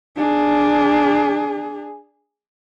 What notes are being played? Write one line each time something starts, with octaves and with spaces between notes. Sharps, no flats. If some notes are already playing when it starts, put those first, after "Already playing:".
D4 G#4